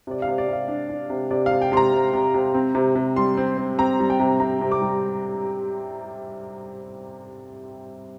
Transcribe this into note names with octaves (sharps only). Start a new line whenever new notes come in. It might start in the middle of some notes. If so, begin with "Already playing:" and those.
C3 D5
F5
C3
D5
C3 F5
D4
D4
C3
C3 D5
F5
C3
G5
C3 C6
A#5
C3
C3
C3
C4
C3
C3
G3 C6
C4
C4
C4 A#5
G3
G5
C3
C3 A#5
C3
D6
G3